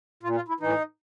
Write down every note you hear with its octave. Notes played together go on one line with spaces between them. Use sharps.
A#2 F4
F4
E4
A2 E3 D#4